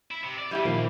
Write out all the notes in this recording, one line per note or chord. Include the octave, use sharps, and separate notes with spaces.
E4
C3
D5
C2 E3 G3 E4 G4
A#2 D#3 F3 A#3